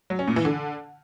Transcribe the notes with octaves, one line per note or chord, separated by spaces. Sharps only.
F#3
C#4
A#2
E3
D3